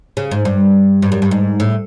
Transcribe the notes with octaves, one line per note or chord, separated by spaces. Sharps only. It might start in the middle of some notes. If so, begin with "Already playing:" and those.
C#3
G#2
G2
G2
F#2
G2
G#2
A2